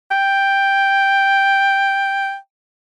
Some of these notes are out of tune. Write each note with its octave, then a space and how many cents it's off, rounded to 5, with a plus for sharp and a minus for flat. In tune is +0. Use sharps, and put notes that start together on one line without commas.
G5 +5